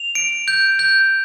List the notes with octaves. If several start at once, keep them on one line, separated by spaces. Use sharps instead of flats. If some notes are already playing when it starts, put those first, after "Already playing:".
Already playing: F7
D7
G6
G6